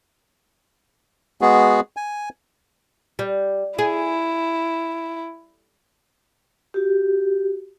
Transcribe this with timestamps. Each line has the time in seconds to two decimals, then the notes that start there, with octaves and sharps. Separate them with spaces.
1.41 G#3 B3 F#4 G#4
1.97 G#5
3.19 G3
3.79 E4 G#4
6.74 F#4 G4